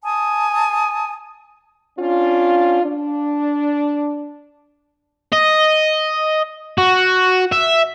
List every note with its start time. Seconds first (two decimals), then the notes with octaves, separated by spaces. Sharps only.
0.04 G#5 A5 D#6
1.97 C#4 D4 F4
2.83 D4
5.33 D#5
6.78 F#4
7.52 E5